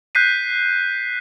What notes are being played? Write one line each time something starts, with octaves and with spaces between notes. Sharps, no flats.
F#6 G6 B6 C7 D#7